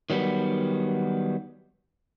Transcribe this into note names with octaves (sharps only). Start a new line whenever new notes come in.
D#3 F#3 G3 B3